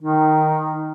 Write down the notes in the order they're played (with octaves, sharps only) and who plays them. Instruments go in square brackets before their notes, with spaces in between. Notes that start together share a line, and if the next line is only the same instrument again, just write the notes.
[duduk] D#3 [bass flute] D#4